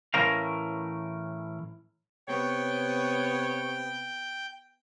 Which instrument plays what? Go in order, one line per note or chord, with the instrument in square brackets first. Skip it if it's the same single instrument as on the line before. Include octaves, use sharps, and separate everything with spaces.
[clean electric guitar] A2 E3 C#4 A#4 F5
[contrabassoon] C3 [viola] B3 [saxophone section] C#5 [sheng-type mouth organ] G5